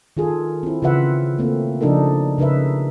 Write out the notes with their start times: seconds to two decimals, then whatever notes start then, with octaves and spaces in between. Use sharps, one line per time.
0.17 D#3 F4 G#4 A4
0.63 C4 E4
0.82 C#3 E3 F4 B4 E5 F#5
1.39 A3 A#3 C4
1.81 C#3 F3 D4 D#4 A4 A#4
2.38 C#3 D#4 A#4 B4 E5